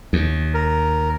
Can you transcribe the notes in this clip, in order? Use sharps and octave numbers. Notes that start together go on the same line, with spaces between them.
D#2
A#4